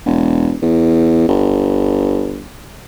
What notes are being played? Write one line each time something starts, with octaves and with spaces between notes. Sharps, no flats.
E1
E2
G1